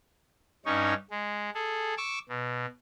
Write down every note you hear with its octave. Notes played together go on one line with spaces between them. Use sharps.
G2 C#4 D#4 C#5
G#3
G#4 A4
C#6 D6 E6
B2